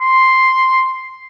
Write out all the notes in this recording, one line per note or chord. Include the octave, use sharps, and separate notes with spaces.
C6